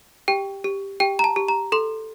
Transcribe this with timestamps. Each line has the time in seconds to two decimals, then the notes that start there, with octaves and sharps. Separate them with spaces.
0.28 G4 G5
0.64 G4
1.00 G4 G5
1.19 A#5
1.24 A5
1.36 G4
1.48 A#5
1.72 A4 C6